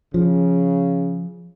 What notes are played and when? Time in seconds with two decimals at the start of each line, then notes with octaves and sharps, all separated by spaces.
0.14 C#3 F3